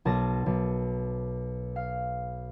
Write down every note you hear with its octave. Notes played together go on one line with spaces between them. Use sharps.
B1 A#4 A5 A#5 A#6
B1
F5